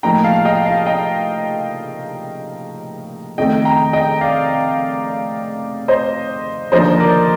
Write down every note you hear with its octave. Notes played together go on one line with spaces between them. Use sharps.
A2 F3 A#3 D#4 G5 A#5
F5 A5
D#5 G5
F5 A5
D#5 G5
F2 D#3 A3 D#5 G5
G5 A#5
D#5 G5
D5 F5
C5 D#5
D#2 D3 F3 A#3 D#4 C5 D#5
A#4 D5